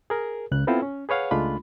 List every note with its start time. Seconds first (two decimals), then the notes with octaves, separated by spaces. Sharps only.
0.10 G#4 A#4
0.51 C#2 C#3 F#6
0.67 B3 C4 E4 F4 A4 C5
0.82 C#4
1.09 G#4 B4 C#5 F5 F#5
1.31 C#2 G#3 A3 D4 F4 B5